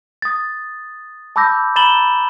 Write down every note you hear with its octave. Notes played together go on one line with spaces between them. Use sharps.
D#6 A6
A5 B5 D6 E6 G6 A#6
A#5 B5 A6 E7 F#7 G7